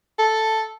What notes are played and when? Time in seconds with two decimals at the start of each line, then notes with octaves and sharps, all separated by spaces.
0.19 A4